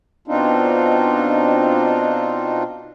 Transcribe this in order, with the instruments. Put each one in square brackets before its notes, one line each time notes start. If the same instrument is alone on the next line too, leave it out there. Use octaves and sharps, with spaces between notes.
[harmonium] B2 C4 D4 D#4 F4